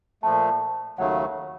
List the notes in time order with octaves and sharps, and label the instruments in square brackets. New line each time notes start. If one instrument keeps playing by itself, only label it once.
[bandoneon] A#2 F3 A3 [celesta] A5
[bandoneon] D#2 C#3 F#3 A3 [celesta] F#5